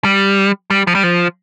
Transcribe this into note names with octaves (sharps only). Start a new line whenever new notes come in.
G3
G3
F3
G3
F3